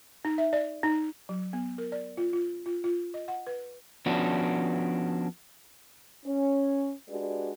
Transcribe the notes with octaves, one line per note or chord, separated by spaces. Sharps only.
D#4
E5
D5
D#4
F#3
B3
A#4
D5
F4
F4
F4
F4
D#5
F#5
B4
F3 B3 C#4 D4 F#4
C#4
G#3 D4 F#4 G4 B4 D5